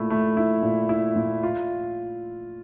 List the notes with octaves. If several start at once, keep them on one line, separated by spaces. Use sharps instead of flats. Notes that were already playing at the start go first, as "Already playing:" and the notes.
Already playing: A#2 A3 E4
A3
E4
A#2
E4
A#2
F4